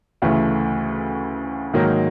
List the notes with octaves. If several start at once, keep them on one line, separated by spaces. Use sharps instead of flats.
D2 C#3 E3 A3
G#2 D#3 F#3 A#3